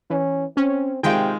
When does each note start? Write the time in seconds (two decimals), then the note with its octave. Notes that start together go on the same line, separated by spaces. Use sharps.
0.10 E3 C#4
0.57 C4 C#4
1.03 C3 D#3 G#3 F4 G5